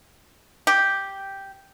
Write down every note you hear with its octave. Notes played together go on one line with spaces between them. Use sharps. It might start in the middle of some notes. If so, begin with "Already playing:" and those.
G4